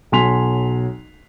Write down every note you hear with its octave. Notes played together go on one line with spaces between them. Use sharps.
B1 F#3 G#5 C6 B6 F7